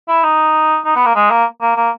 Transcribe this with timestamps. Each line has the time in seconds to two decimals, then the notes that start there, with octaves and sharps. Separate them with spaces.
0.08 E4
0.23 D#4
0.85 D#4
0.96 B3
1.05 A#3
1.16 G#3
1.31 A#3
1.61 A#3
1.76 A#3